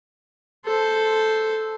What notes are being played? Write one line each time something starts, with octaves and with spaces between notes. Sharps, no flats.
A4 C5